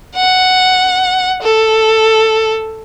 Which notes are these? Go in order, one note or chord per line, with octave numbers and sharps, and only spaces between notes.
F#5
A4